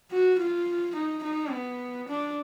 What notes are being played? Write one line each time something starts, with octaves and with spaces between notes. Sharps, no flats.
F#4
F4
D#4
D#4
B3
D4